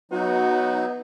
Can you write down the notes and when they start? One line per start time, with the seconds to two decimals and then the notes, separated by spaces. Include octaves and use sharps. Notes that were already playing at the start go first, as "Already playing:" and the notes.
0.12 F#3 B3 D#4 F#4